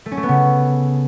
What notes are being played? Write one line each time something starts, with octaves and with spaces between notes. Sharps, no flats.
A3
C#4
A3
B3
C#3